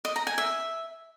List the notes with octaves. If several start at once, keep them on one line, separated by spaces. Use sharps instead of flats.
D#5
A#5
G#5
E5